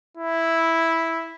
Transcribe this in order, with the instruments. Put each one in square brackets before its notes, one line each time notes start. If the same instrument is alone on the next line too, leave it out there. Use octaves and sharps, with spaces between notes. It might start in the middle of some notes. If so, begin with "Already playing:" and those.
[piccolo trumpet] E4